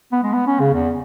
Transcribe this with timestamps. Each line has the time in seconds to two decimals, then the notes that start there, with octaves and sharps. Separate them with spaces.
0.12 B3
0.23 G#3
0.33 B3
0.47 C#4
0.60 C#3
0.74 E2